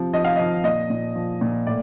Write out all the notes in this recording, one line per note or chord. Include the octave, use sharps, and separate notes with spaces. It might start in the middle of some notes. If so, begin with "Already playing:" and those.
Already playing: C3 F3
F3 D#5
F5
F3 D#5
A#2 D#5
A#2
F3
A#2
A2 D5